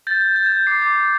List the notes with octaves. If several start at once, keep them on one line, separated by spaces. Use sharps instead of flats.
G6 A6
G6
G6
G#6
G6
D6 C7
D6
D6